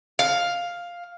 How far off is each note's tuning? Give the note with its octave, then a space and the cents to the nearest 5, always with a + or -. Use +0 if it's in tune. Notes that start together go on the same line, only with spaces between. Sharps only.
F5 +5